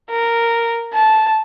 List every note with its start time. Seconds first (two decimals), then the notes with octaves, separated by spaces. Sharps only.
0.11 A#4
0.94 A5